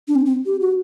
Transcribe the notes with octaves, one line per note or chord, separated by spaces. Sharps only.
D4
C4
C4
G4
F#4